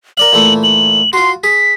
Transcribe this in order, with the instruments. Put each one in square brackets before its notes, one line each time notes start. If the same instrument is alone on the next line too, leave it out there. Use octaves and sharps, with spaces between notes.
[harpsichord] A#4 D5 F5 [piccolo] F#7
[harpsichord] A#2 E3 A3
[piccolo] F#7
[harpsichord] F4 F#4 [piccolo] C6
[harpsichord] G#4 [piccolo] B6